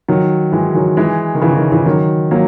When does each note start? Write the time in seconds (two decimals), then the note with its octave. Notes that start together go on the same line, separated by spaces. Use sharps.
0.08 D#3 F#3
0.52 E3 G#3
0.75 D#3 F#3
0.97 E3 G#3
1.35 D#3
1.41 C#3 E3
1.57 D#3
1.72 C#3 E3
1.86 D#3 F#3
2.31 F#3 A#3